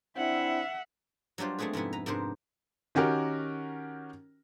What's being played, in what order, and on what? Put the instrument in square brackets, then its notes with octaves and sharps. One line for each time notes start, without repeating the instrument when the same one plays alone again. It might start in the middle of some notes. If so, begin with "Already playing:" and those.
[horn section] C4 D4 E4 [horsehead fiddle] E5 F#5
[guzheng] F#3 G3 D4 F4 C5
G#3 A3 B3 C4 G#4 B4
F2 G#2 C3 B3 E4
B4 A#5
G#2 C3 B3 D4 A#4 C5
[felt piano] D#3 C#4 F#4 G4 A#4